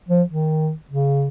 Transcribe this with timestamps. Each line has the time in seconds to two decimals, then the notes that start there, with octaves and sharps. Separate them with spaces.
0.09 F3
0.29 D#3
0.90 C#3